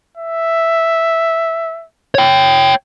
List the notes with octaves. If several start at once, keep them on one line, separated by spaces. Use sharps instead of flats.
E5
C#5 G5